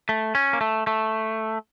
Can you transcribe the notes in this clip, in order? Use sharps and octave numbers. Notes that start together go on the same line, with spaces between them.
A3
C#4
A#3
A3
A3